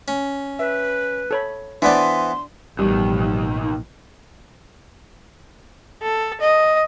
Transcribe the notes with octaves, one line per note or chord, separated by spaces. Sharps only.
C#4
B4 E5
A4 C#5 B5
E3 B3 D4 C5 D5 C6
A1 D#2 B2 D#3 F3 G3
A4
D#5